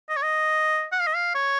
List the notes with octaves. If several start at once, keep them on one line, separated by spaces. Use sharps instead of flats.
D#5
C#5
D#5
F#5
F5
D#5
F5
C#5